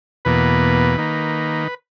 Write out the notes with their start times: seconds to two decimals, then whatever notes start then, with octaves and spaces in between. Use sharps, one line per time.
0.25 E2 B2 A#3 B4
0.98 D#3 A#3